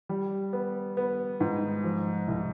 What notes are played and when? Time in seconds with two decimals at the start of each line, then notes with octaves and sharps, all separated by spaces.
0.09 G3
0.53 B3
0.97 B3
1.40 G#2
1.84 F3
2.28 C2